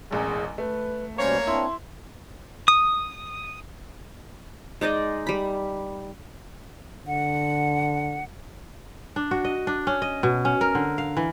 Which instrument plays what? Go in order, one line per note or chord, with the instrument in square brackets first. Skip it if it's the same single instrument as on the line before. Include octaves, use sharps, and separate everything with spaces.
[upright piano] E1 A1 E2 [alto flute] G#4
[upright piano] A3 [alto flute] B4
[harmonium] B2 G3 C#4 [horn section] A#3 C#5 [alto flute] C5
[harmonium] C4 D4 [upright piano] E4 [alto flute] C6
[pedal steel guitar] D#6
[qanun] G#3 D#4 D5 D#5
G3 B5
[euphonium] D3 [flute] F#5
[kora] D4
F#4
D#5
D4
C#4
D#5
B2
C#4
A#4
D3
F5
E3